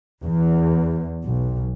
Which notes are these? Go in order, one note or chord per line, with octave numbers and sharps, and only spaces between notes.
E2
B1